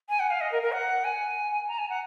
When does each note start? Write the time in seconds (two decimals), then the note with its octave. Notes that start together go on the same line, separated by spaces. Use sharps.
0.09 G#5
0.20 F#5
0.30 F5
0.41 D#5
0.52 A#4
0.62 A#4
0.72 F#5
1.04 G#5
1.68 A#5
1.79 G#5
1.89 F#5